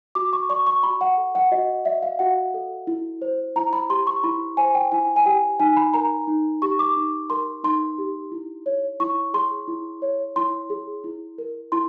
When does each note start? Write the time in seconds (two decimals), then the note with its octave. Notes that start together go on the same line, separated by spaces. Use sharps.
0.15 F#4 D6
0.33 C#6
0.49 D5 C#6
0.67 C#6
0.83 F#4 B5
1.01 F#5
1.17 A4
1.35 F#5
1.51 F#4 D#5
1.85 D5 E5
2.03 F5
2.19 F#4 F#5
2.54 A4
2.87 E4
3.22 C5
3.56 E4 A#5
3.73 B5
3.90 G4 C6
4.07 C#6
4.24 E4 B5
4.57 C5 G#5
4.75 G5
4.92 E4 G#5
5.16 G#5
5.26 G4 G5
5.60 D#4 G#5
5.77 B5
5.94 A#4 A#5
6.27 D#4
6.62 G4 C#6
6.79 D6
6.96 D#4
7.30 A#4 C6
7.64 D#4 C6
7.98 G4
8.32 E4
8.66 C#5
9.00 E4 C#6
9.34 G#4 C6
9.68 E4
10.02 C#5
10.36 E4 C6
10.70 G#4
11.04 E4
11.38 A#4
11.72 E4 C6